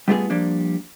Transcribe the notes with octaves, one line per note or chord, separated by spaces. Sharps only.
G3 A3 B3 F4 F#4 G#4
F3 G3 A#3 D4